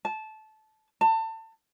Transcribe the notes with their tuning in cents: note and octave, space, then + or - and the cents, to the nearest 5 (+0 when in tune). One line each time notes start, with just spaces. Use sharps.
A5 -15
A5 +30